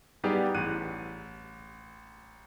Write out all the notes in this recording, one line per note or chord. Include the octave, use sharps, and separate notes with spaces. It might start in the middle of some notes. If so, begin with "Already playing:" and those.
G3 B3 D#4 G4 G#4 D5
A1 F#6 D#7